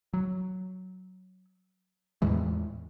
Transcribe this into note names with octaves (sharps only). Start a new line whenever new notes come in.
F#3
E2 A2 E3 G#3